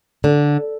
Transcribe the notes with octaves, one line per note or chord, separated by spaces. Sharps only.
D3